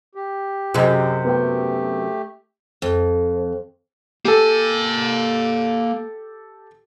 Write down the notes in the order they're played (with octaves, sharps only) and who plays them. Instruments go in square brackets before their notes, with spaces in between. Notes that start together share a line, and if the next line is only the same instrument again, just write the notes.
[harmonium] G4
[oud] F#2 C3 [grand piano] G#4 D#5
[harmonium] A3 G4 [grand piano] B3 G5
[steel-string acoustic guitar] F2
[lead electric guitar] A#3 G#5 [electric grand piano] G4 A4